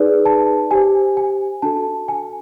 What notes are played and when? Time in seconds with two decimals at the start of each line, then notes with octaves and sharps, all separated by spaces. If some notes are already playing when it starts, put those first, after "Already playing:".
Already playing: D#4 G#4 B4 D5
0.25 A5
0.71 G4 C5 G#5
1.17 G#5
1.62 D4 F#4 A4 A5
2.08 G#5